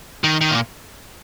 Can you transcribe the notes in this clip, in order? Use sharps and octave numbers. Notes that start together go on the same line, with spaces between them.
D#3
D#3
A#2